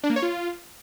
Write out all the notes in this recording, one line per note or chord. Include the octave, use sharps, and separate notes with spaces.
D4
A#3
C#5
F4